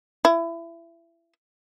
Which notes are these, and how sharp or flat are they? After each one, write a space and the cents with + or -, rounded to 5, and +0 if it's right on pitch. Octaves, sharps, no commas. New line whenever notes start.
E4 +25